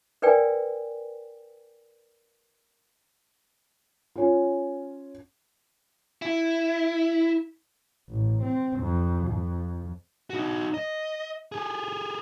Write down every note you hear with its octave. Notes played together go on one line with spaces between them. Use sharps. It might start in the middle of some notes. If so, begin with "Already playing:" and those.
A#4 B4 D5 G5 G#5
C#4 F4
E4
A1
C4
F2
F2
D#4 F#4
D#5
G4 G#4